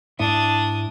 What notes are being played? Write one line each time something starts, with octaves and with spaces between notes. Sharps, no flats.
G#2 D4 E4 E5 D#6